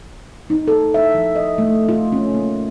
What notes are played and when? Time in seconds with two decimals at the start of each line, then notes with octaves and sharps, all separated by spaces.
0.50 D#4
0.68 A4
0.94 E5
1.14 F3
1.35 D#5
1.58 A3
1.89 F4
2.12 C#4
2.34 A#3